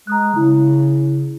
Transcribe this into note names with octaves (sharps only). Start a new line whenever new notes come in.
G#3 A#5 D#6 F#6
C#3 E4